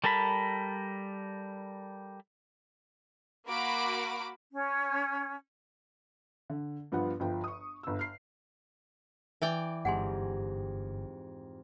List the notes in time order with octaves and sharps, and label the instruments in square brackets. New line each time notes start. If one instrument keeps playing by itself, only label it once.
[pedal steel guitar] G3 A4 A#4 A5 B5
[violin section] A#3 F#4 B5 D6 D7
[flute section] C#4
[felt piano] D3
G2 F3 B3 F#5
G1 F3 G5
C#6 D#6
G1 E6
F6 C7
[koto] E3 D5 G5
[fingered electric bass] G1 [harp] F2 G#2 G4 [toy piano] F#5 G#5 C6